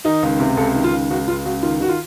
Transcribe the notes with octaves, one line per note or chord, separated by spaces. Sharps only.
D#3 D#4
C#2
C3
C#2 A4
D#3
F4
C#2
C#2 F#4
C#2 F4
C#2 F#4
D#3 F4
D#3 F#4
F4